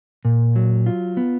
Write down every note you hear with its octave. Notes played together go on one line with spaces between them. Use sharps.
A#2
F#3
F4
B3